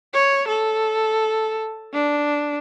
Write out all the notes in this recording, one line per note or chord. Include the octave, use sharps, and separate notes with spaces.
C#5
A4
D4